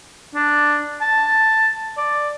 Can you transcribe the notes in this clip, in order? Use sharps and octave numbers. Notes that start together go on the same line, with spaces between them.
D4
A5
D5